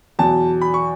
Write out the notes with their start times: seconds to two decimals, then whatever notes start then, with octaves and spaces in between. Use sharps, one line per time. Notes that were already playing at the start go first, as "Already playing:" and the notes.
0.19 E2 B2 F#3 A5
0.61 B5
0.74 C#6